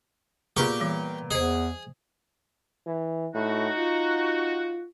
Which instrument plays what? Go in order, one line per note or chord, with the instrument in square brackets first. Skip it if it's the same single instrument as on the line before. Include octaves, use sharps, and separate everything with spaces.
[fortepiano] A#2 B3 A#4 [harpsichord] G4 C#6 [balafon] G#4
[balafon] E3 G3
[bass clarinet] E2 [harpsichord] G#4 [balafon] C5 D#5
[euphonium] E3
[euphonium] A2 [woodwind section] D#4 F#4
[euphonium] F4